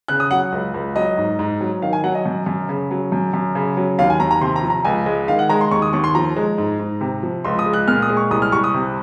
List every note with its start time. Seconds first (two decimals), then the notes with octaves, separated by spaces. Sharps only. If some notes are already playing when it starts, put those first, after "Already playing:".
0.08 C#3 F#6
0.20 D#6
0.31 F#3 F#5
0.52 C#2
0.74 C#2
0.96 F#3 D#5
1.18 G#2
1.39 G#2
1.61 F#3
1.82 D#3 F5
1.93 G#5
2.04 F#3 F#5
2.15 D#5
2.26 F#2
2.46 F#2
2.69 C#3
2.91 F#3
3.12 F#2
3.34 F#2
3.55 C#3
3.77 F#3
3.99 D#2 F5
4.10 G#5
4.20 D#2 A#5
4.31 A#5
4.41 C3 C6
4.56 A#5
4.63 F3
4.70 A#5
4.85 C#2 G#5
5.06 G#3
5.28 D#3 F5
5.39 F#5
5.49 G#3 A#5
5.61 C6
5.71 D#2 C#6
5.82 D#6
5.93 D#2 C#6
6.04 C6
6.15 F3 A#5
6.36 G#3
6.58 G#2
6.79 G#2
7.01 C3
7.23 F3
7.45 C#2 C6
7.59 D#6
7.66 G#3
7.73 F#6
7.88 A#2 F6
8.02 D#6
8.09 G#3
8.17 C#6
8.31 C2 D#6
8.42 F6
8.52 C2 C#6
8.64 D#6
8.74 C3